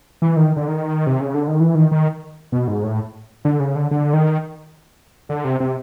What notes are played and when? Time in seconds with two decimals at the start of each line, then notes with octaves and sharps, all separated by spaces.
0.22 E3
0.37 D#3
0.56 D3
0.68 D#3
1.07 C3
1.20 C#3
1.34 D3
1.47 D#3
1.60 E3
1.75 D#3
1.91 D#3
2.52 B2
2.68 G#2
2.83 A2
3.45 D3
3.60 C#3
3.76 D3
3.91 D3
4.13 D#3
5.29 D3
5.45 C3
5.60 C3